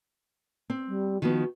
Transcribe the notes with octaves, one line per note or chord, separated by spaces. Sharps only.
C4
G3
D#3 F3 B3 F#4